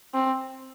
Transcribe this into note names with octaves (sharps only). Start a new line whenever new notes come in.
C4